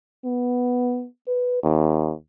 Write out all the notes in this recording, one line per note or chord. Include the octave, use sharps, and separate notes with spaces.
B3
B4
D#2